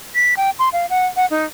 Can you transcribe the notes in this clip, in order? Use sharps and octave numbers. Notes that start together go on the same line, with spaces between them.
B6
G5
C6
F5
F#5
F#5
D#4